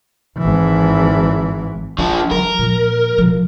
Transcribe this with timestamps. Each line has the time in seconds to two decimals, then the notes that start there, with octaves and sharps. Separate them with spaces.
0.38 G#1 E3
1.98 F3 D4 F4
2.31 E3 F#3 A#4
2.59 A#2 F3
3.18 B2 F3